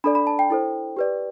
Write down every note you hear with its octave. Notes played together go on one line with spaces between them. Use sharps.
D4 A4 D5 B5
B5
A5
G5
E4 A4 C5
G4 B4 D5